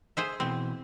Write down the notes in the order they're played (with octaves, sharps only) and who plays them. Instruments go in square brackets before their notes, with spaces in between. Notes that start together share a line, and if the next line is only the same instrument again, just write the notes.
[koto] G#4 C5 E5
[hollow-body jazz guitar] B2 E3 C6 [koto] C4